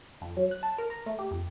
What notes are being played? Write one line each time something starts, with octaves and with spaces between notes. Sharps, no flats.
F2
F#3
F#6
A5
A#4
A#5
A3
G4
F2